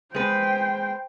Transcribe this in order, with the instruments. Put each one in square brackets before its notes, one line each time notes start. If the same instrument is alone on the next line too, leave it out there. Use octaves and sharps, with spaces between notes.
[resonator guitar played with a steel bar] G#3 B4 [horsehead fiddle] C5 G5